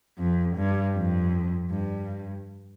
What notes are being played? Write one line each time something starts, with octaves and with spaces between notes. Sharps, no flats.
F2
G2
F2
G2